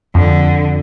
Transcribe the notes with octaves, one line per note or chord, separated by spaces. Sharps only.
F2 D3